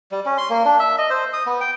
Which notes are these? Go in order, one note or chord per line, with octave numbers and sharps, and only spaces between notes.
G3
C#4
C6
A#3
D4
E5
D#5
C5
D#6
B3
G5